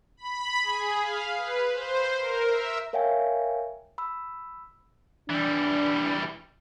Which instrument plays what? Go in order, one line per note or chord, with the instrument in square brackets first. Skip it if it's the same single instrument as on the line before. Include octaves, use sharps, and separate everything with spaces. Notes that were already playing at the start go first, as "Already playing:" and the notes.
[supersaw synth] B5
G#4
F5
B4
C5
A#4
E5
[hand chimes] A#4 C#5 E5 F5 G5 G#5
B5 E6
[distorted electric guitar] E3 G3 [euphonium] D4